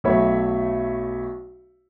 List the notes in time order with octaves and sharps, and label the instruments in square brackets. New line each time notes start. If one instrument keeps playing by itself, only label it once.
[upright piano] B1 A3 C#5 E5 B5